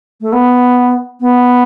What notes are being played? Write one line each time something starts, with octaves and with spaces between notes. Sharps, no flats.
A3
B3
B3